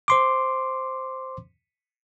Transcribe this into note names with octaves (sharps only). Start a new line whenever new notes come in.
C5 C6 D6